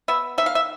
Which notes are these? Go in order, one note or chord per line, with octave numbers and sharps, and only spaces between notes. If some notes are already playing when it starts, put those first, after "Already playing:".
B3 E5
D#3 E5
F5
E5